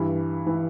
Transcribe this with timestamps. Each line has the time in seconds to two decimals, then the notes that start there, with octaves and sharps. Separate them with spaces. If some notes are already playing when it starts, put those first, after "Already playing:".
Already playing: G2 E3
0.46 E3